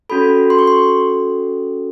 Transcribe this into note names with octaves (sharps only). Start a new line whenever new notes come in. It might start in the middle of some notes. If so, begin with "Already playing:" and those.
C#4 F#4 A4 B5
C6
C#6
C6